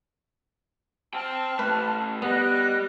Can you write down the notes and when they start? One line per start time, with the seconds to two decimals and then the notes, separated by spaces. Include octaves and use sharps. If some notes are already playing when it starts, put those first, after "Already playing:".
1.14 C5 G5 A5 F6
1.59 E3 A3 B4
2.22 B3 G4 D5 D#5 F#6